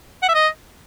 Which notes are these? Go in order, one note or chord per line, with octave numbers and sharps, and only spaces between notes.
F#5
E5
D#5